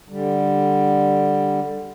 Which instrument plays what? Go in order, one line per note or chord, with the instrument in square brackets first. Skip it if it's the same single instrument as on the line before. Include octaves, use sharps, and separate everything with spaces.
[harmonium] D3 G3